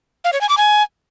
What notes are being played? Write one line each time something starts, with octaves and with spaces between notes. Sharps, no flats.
F5
C#5
G#5
D6
G#5